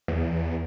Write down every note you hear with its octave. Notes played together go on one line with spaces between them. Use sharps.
E2